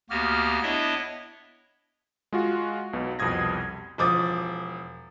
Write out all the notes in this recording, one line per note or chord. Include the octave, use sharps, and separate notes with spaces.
D2 A#3 B3 F#4 G4 F6
B3 D4 E4 C#5 D#5 E5
G#3 F4 F#4
B1 B2
C2 F2 B2 D#6 G#6 A#6
E1 F3 D6 D#6 A6